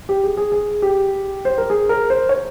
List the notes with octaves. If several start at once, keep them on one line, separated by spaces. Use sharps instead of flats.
G4
G#4
G#4
G#4
G4
C5
A#4
G#4
A#4
C5
C#5